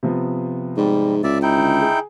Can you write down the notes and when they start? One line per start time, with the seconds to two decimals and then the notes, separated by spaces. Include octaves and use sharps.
0.03 C3 F3 B3
0.77 G#2 G3
1.24 C#2 D5 E5
1.42 D#4 E4 G5
1.57 D3
1.81 G#4